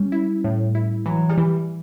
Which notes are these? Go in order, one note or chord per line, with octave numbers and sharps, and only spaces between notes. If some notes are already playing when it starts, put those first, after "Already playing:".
Already playing: G3 C#4
E4
A2
E4
E3 F#3
G3
E3